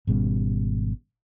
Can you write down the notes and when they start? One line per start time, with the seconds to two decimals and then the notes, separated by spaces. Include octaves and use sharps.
0.07 G#1 B2 G3 C#4